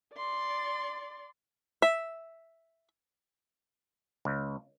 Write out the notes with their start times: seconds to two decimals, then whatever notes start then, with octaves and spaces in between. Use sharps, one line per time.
0.14 D5 C6
1.82 E5
4.25 C#2